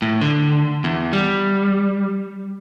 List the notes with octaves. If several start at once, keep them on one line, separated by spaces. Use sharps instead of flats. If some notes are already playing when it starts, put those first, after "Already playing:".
A2
D3
E2
G3